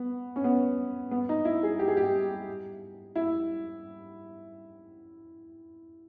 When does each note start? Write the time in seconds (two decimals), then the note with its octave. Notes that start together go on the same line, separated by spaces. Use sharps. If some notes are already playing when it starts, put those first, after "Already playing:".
Already playing: B3
0.36 C#4
0.44 B3
1.11 B3
1.29 D#4
1.45 E4
1.63 G#4
1.79 G4
1.88 G#4
1.97 G4
3.16 E4